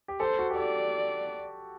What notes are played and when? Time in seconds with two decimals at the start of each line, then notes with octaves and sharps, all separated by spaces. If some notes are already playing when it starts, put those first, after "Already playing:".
0.08 G4
0.20 A4 C5
0.39 F#4
0.50 G4
0.56 A4 D5